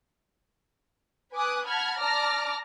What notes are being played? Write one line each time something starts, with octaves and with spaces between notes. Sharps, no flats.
B4 G#5 D6 D#6 F#6
F#5 A5 B5 F6 G#6
D5 A5 A#5 D6 F6 A#6